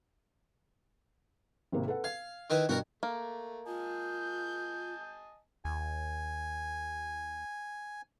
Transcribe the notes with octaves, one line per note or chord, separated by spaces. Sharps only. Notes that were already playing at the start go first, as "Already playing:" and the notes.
G#1 C3 A#3
A4 B4 F#5
F5 G#6
D#3 E4 B4
G2 B2 F#4 A#4 G5 A#5
A3 A#3
F4 D#5 G#5 A5 G6
D#2 G#5